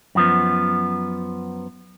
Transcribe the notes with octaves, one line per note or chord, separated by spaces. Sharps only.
F#2 F3 B3